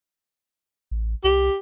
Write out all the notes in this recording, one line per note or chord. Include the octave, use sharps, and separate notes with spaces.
A1
C2 G4